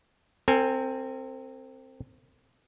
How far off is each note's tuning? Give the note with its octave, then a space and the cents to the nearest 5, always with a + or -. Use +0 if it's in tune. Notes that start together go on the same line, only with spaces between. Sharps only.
C4 +5 A#4 -45 G#5 +0